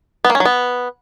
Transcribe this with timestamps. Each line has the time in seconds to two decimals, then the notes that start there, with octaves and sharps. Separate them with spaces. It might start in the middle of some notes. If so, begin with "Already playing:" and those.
0.25 B3
0.30 A#3
0.35 C#4
0.40 F#3
0.45 B3